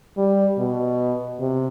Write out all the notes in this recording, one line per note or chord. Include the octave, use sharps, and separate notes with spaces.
G3
B2
C3